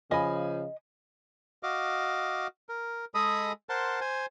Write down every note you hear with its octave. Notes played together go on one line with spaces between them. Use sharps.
C#3 F3 D#5 G#5 B5
F#4 D#5 F5 D6
A#4
G#3 G#4 A4 D#5 B5 D#6
A#4 C5 F#5 A5 C6
C5 G#5